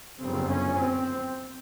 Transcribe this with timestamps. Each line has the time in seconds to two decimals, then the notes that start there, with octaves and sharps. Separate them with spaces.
0.19 G1 F#2 C#3 C4
0.48 C#4
0.76 C4